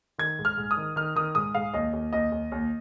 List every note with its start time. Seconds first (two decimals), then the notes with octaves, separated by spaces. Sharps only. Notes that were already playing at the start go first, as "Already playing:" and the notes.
0.18 D#3 G#6
0.39 G#2
0.45 F6
0.57 G#2
0.71 D#6
0.77 D#3
0.96 D#3 F6
1.16 D#3 D#6
1.35 G#2 D#6
1.55 G#2 F5
1.73 D#2 D#5
1.93 D#2
2.13 D#2 D#5
2.32 D#2
2.52 D#2